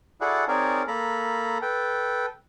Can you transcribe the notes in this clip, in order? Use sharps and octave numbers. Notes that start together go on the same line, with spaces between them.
E4 F#4 G#4 A4 D5 F#5
C4 D#4 G#4 A#4 C#5 D5
A#3 A4 A#5 B5
A4 B4 G5